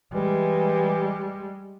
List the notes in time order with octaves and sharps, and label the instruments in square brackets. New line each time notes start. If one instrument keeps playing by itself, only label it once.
[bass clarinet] E3 [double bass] G3 G#3